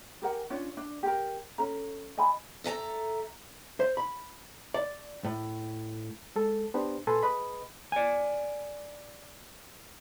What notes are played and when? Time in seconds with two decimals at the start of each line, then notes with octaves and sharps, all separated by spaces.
0.22 G4 A#4 F#5 G#5
0.50 C#4 D4 F4 C#5
0.77 D4
1.03 G4 A#4
1.58 C#4 A4 A#5
2.17 D#5 G#5 B5
2.64 A4 E5 A5 A#5
3.80 C5
3.97 B5
4.74 D5
5.25 A2
6.36 G#3 A4
6.74 B3 D4 G4 C5
7.07 A#2 A4 B4 G#5 C6
7.23 G#4 B4 D#5 B5
7.92 D5 G#5